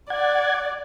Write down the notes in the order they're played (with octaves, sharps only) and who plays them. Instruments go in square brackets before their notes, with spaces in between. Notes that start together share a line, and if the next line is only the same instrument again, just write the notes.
[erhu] D5 [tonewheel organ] F#5 G#6